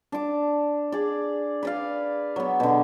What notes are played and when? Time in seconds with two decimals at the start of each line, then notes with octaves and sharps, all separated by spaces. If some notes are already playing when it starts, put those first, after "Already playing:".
0.12 D4 D6
0.92 G#4 D5
1.63 B4 D5 F5
2.36 F#3 B3
2.60 B2 D3